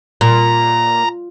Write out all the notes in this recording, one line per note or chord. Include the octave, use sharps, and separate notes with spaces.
A#2 A#5